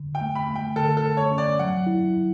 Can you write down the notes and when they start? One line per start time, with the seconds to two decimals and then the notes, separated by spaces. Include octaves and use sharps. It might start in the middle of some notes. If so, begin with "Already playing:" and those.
Already playing: D3
0.15 G5
0.21 A3
0.35 B5
0.49 A3
0.55 G5
0.76 D3 A4
0.97 A4
1.04 A3
1.17 C#5
1.31 C#4
1.38 D5
1.59 F#3 F#5
1.87 E4
2.14 E4